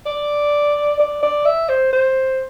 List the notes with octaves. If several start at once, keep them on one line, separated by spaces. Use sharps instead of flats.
D5
D5
D5
E5
C5
C5